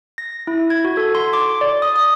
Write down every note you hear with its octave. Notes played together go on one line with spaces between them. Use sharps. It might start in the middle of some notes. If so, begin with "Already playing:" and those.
A#6
E4
G#6
F#4
A4
C6
D6
D5
D#6
D#6